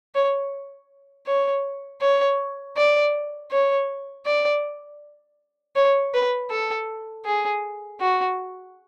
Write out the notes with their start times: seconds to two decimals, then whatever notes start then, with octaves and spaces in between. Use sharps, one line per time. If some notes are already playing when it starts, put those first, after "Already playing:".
0.15 C#5
1.27 C#5
2.01 C#5
2.77 D5
3.51 C#5
4.26 D5
5.76 C#5
6.14 B4
6.51 A4
7.25 G#4
8.01 F#4